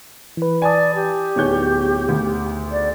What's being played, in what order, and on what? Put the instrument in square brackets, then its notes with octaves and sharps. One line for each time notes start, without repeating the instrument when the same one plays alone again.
[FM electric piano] E3 B4
[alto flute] D5 [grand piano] G#5 A5 D#6
[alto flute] G4
[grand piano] D1 C#5 G6 [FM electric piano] B3 D#4 G#4
[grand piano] D2
[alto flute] D5